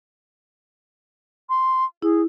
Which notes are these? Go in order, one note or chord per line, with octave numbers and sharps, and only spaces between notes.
C6
E4 G#4